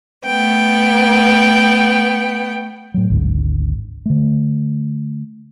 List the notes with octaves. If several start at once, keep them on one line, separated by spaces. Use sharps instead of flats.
A3 B3 G5
A2 F#3
G#1 D2 G#2
D3 A3